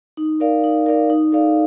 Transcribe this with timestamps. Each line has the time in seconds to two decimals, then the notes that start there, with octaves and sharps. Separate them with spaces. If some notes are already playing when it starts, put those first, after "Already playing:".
0.17 D#4
0.40 A#4 D5 F5
0.64 D#4
0.86 A#4 D5 F5
1.10 D#4
1.32 A4 D5 F5